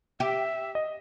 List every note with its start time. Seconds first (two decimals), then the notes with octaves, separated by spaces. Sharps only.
0.20 G4 E5
0.75 D#5